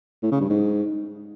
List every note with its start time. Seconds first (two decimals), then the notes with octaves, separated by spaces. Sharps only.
0.23 A2
0.32 C#3
0.41 G2
0.50 G#2